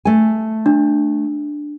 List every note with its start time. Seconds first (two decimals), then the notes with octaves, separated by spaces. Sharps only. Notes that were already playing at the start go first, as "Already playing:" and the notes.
0.05 A3 G#5
0.66 D4